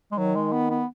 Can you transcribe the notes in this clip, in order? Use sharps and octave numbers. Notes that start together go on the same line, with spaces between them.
G#3
D#3 F#3
G#3
B3
B3